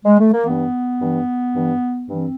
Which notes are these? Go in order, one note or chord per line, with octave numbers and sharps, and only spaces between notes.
G#3
A3
A#3
G2 E3 B3
G2 E3
G2 E3
G2 E3 C4